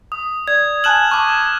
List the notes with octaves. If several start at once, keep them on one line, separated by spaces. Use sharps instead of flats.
D#6
D5 G#6
G#5 A5 F6 F#6 E7 F#7
A5 B5 C#6 D6
F6